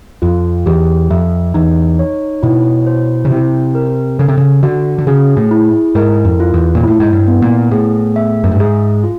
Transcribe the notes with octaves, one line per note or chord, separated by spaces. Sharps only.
F2 F4
E2 G4
F2 E5
E2 D#4
C#5
B2 E4
C5
C#3
C3 E4
A#4
C#3 A4
C3
C#3
D3 F#4
D3
C#3 G#4
A2
E4
G#2 A#4
F2
F4
E2
A#2
A2 E4
G#2
G2
B3
A#2
A2 G#4
E5
F#2
G2
G#2 G#4
F4